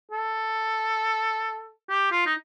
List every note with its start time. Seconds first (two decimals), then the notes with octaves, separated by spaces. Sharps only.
0.12 A4
1.90 G4
2.12 F4
2.26 D#4